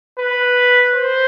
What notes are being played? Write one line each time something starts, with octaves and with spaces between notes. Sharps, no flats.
B4
C5